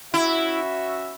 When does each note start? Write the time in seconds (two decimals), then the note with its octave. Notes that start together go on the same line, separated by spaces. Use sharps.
0.13 C#4 E4 F#4 E5